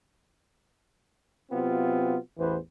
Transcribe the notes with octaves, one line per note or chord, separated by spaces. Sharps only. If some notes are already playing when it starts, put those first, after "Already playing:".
C3 F#3 B3 C4 F4
A1 E2 E3 B3 B4 C5